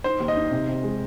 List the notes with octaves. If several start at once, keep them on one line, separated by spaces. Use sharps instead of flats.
D#4 C5
D#2
D#5
D#4
C3
C3
G#3